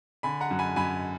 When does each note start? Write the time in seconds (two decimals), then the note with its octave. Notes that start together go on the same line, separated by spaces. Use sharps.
0.23 D3 G#5 B5
0.41 F#5 A#5
0.51 F#2
0.59 G#5 B5
0.76 F#2 G#5 B5